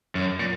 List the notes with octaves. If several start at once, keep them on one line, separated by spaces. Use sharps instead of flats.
F#2
A#2